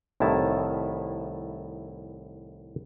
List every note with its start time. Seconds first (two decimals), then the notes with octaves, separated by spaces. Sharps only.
0.20 C2 A2 D#3 E4 A5